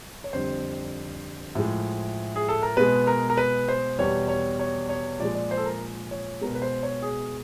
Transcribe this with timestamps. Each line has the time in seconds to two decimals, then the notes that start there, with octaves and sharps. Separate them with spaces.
0.24 C#5
0.33 F2 D3 G3 C5
1.55 A2 F3 G#3
2.36 G#4
2.49 A4
2.63 A#4
2.77 B2 G#3 B4
3.07 A#4
3.30 A#4
3.37 B4
3.69 C5
3.98 E2 B2 G3 C#5
4.28 C#5
4.59 C#5
4.89 C#5
5.19 A#2 F3 G#3 D5
5.35 D5
5.51 C5
5.57 A4
5.66 A#4
6.11 C#5
6.41 B2 G#3 A#4
6.55 B4
6.62 C5
6.83 C#5
7.02 G#4